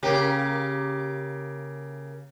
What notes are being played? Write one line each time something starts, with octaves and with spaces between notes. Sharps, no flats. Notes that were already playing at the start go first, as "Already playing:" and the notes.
C#3 A#3 G4